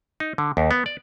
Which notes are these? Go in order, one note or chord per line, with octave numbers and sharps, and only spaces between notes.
D#4
D3
D#2
B3
D5